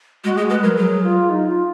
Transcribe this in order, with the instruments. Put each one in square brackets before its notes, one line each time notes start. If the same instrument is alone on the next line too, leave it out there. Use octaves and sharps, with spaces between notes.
[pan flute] G#3 [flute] F#4
[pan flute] G#3 [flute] G#4
[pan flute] G#3 [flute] B4
[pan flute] F#3 [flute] A#4
[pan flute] F#3 [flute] G#4
[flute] F4
D#4
F4